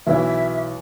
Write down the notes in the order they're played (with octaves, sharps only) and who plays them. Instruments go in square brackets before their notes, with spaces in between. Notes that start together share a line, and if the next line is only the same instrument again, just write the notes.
[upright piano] B1 E3 [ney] E5